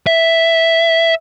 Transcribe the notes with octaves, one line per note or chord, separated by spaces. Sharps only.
E5